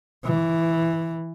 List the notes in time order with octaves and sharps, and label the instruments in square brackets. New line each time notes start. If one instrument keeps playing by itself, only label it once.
[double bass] E3